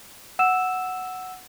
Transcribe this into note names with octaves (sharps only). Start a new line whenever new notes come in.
F#5 E6 E7